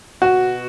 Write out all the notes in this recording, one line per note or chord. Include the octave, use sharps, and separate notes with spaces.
B2 F#4